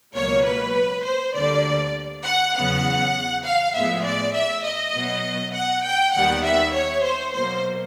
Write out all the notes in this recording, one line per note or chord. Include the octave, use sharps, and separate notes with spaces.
C#2 B2 F#3 A#3 C#5
B4
C5
D2 D3 G3 A#3 D5
F#5
E2 C#3 F#3 B3 F#5
F5
A2 F3 G#3 B3 E5
D5
E5
D#5
B2 F#3 B3
F#5
G5
D#2 D#3 G3 B3 F#5
E5
C#5
C5
B2 F#3 A#3 C5